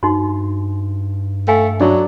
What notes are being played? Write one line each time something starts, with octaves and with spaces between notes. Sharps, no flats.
G2 D#4 F#4 C6
A3 F5 G5 G#5
F#3 D4